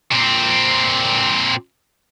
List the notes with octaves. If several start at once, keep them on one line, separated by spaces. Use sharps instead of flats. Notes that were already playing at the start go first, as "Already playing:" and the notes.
A#2 C4